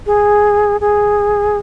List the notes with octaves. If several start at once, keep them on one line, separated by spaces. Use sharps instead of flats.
G#4
G#4